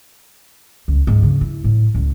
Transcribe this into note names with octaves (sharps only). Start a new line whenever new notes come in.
C#2
G#2
C#3
E4
A2
C#2